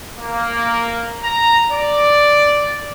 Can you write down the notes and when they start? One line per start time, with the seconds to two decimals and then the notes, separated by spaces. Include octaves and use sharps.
0.19 A#3
1.23 A#5
1.71 D5